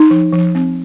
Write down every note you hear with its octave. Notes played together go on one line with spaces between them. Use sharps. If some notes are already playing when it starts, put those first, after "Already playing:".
Already playing: D#4
F3
F3
C4